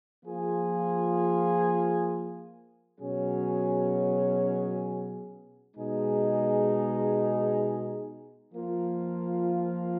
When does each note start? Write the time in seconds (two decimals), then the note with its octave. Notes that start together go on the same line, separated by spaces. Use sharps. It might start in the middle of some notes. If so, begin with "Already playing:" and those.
0.23 F3 A#3 F4 G#4
3.00 B2 F#3 C#4 G#4
5.75 B2 G#3 D#4 G#4
8.51 F3 A#3 F4